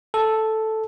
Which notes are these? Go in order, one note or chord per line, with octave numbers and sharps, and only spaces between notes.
A4